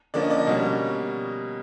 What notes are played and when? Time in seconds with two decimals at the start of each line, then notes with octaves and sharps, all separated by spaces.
0.14 D3 F3 A#3 C#4 D5
0.22 D#5
0.30 D5
0.38 D#5
0.47 B2 G3 A#3 C#4